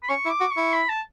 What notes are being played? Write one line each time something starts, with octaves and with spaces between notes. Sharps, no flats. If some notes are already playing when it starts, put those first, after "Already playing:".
B5
C#4 C#6
E4
D6
F#4
C#6
E4
B5
A5